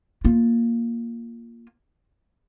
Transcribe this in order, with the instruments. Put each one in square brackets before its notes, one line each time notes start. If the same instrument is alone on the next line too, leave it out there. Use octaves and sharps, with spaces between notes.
[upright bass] A#3 F4